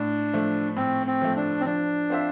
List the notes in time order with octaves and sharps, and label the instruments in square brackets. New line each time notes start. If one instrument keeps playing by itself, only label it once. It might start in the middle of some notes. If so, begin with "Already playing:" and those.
Already playing: [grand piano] A2 [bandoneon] D4
[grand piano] F3 A3
[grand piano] A2 [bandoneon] C4
[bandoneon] C4
[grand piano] F3 A3
[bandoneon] D4
C4
[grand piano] F3 [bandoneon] D4
[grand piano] C4 F4 C5 E5